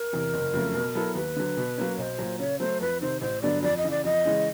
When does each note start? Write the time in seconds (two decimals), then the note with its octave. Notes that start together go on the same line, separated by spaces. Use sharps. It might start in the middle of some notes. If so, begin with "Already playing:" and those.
Already playing: A#4
0.13 E2 C3
0.34 F#1
0.54 F2 C#3 F#3 A3
0.75 B2
0.95 F#3 B3 E4 A4
1.15 D#2 B4
1.36 D3 F#3
1.57 B2
1.78 F#3 A#3 C#4
1.98 B1 C5 C#5
2.19 A#2 F#3
2.39 C#3 C#5
2.59 F#3 A3 C5
2.81 F2 B4
3.01 C3 D#3 C5
3.21 A1 C5
3.42 G2 D3 F#3 B3 D5
3.63 F2 D5
3.77 D#5
3.84 C#3 E3
3.90 D5
4.04 F2 D#5
4.25 C#3 E3 G#3 C#4